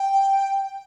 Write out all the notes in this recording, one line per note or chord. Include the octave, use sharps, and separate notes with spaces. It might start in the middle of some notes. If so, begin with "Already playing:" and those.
Already playing: G5